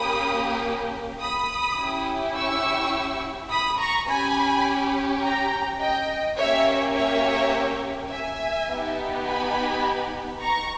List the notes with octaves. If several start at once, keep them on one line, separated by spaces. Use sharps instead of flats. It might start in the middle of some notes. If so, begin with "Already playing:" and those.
Already playing: A#3 C#4 G4 B5 D#6
B5 D#6
C#4 E4 G4
C#6 E6
B5 D#6
A#5 C#6
C#4 G4 G#5 B5
G5 A#5
D#5 G5
A#3 C#4 G4 C#5 E5
C#5 E5
E5 G#5
B3 D#4 G4
G#5 B5
A#5 C#6